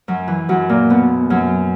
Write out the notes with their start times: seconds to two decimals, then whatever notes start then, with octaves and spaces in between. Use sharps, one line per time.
0.08 F#2 F#3
0.28 E3
0.49 F#2 F#3
0.69 A#2 A#3
0.90 B2 B3
1.30 F#2 F#3